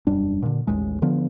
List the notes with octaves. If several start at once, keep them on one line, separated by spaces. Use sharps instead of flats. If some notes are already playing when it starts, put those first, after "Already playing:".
E1 F#2 G3 D4
A#2 D3
A1 D#2 G#3
D3 F3 B3